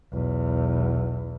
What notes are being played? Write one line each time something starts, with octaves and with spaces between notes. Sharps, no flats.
B1 E2